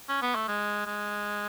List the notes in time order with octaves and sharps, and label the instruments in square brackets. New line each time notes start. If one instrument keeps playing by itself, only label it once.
[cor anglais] C#4
B3
A3
G#3
G#3